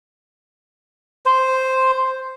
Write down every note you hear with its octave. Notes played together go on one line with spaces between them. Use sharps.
C5